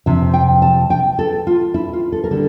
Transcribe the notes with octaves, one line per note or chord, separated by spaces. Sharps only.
F2 C3 F3 E5
G5
A5
G5
A4
F4
E4
F4
A4
A#4
D3 G3 D4 A4